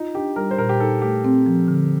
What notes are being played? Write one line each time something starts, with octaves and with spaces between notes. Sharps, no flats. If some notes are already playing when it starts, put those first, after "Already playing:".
Already playing: D#4 F4
D4 G4
G3 A#4
C5
A#2 A#4
G4
D#4 A4
A3 G4
C4
F3
D3